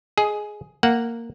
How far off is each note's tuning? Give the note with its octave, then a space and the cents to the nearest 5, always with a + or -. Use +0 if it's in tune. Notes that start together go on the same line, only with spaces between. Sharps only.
G#4 +10 D#5 +0
A#3 -10 F#5 +0